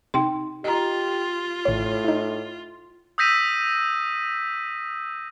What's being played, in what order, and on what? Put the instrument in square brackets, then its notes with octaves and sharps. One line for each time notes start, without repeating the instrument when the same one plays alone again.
[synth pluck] C3 [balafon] D#4 G5 C6
[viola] F4 [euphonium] G4 [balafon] D#5 A#5
[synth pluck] A1 C#5 [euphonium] A2
[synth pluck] D#4 E4
[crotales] D#6 E6 G6 A#6 B6 D#7